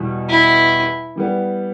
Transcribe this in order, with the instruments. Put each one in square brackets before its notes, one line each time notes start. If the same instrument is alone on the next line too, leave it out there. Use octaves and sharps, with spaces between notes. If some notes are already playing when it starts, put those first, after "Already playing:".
Already playing: [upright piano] E2 B2 G3 B3
[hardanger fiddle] E4
[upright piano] E3 G3 B3